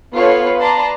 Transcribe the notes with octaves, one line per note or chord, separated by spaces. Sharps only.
B3 F4 A4 B4 C#5
B4 D5 A5 A#5 C6